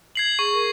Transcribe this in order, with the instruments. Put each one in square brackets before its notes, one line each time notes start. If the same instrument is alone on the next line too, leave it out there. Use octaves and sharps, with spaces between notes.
[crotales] G#6 C7 F#7
[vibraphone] G#4 [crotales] C#6
[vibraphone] A#4